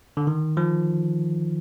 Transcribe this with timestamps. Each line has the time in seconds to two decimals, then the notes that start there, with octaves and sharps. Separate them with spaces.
0.17 D3
0.27 D#3
0.57 F3